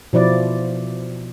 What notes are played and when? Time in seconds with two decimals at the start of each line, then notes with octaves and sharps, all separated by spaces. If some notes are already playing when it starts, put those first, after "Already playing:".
0.13 B2 F3 E4 D5